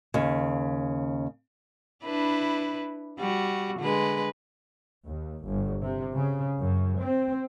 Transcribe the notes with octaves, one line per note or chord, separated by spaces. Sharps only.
D#2 C#3
D4 E4 B4
G3 F#4
D3 G#3 B4
D#2
G1
C3
C#3
F#2
C4